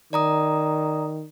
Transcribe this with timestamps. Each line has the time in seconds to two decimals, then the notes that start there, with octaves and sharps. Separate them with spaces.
0.13 D#3 D5 A#5 D#6